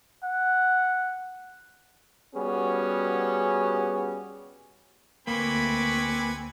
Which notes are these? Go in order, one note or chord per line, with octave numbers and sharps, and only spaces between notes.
F#5
G3 B3 C#4 F#4 G#4
D2 A#3 C4 B4 G#5 B5 C#6 D6